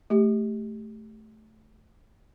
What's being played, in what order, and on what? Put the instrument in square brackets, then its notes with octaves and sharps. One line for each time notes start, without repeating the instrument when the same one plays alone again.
[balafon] A3 G4